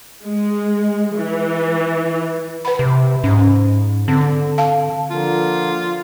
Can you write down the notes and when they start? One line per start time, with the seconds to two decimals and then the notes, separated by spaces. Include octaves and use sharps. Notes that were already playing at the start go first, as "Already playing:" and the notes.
0.24 G#3
1.16 E3
2.65 B4 F#5 B5
2.79 C3
3.24 G#2 C#4
4.08 D3 C4
4.58 F5 A5
5.10 D3 F3 A#3 F4